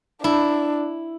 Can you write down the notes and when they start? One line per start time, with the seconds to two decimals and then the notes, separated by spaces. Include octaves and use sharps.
0.23 D4 E4